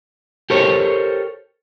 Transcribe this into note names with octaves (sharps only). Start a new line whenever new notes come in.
G4 A4 A#4 C5 C#5